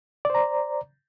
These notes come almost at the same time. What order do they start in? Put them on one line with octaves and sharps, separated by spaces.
D5 C5 A#5